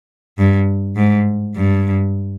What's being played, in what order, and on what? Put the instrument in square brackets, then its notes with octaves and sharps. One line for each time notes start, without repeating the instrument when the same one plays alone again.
[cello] G2
G#2
G2